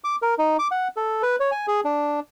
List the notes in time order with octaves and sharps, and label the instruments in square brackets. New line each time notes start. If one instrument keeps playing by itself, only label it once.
[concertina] D6
A#4
D#4
D6
F#5
A4
B4
C#5
G#5
G#4
D4